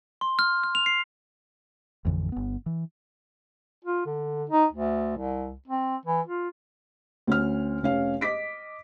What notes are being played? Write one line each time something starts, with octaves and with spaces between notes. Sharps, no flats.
C6
F6
F6
F7
C7
A1 F2 D3 E3
G1 B3
E3
F4
D3
D#4
D2
C2
C4
E3
F4
D2 C#4 F6
F1 C#4 F5
D#5 D6 B6 D7